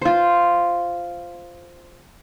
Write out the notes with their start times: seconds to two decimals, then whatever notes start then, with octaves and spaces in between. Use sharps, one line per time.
0.01 F4 C5